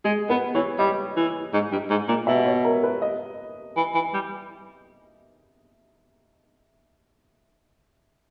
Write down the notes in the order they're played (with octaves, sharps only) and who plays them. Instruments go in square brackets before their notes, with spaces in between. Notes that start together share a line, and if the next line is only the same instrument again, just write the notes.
[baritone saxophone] G#3 [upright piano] G#4
[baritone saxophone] B3 [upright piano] B4
[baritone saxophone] E3 [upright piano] C#5
[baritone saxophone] G3 [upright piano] D#5
[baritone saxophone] E3
G#2
G2
G#2
A#2
[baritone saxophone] B2 [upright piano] E5
[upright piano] C#5
A#4
B4
D#5
[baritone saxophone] E3
E3
G3